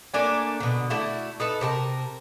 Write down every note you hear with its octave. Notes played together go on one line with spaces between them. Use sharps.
A3 A#3 D4 G#5
B2 D3
A3 D4 E4 F#4
D#4 A4 B4
C3 A#4 A5